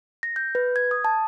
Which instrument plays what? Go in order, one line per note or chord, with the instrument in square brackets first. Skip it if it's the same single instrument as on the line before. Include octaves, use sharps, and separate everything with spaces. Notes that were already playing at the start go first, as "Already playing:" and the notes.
[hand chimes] A#6
G6
B4
G#6
D#6
A5